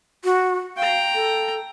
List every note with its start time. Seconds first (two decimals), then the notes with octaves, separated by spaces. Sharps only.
0.24 F#4
0.77 F5 G5 A#5
1.15 A4